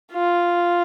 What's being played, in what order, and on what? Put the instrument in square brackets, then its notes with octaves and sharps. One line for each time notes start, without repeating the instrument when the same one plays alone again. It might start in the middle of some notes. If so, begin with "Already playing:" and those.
[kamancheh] F4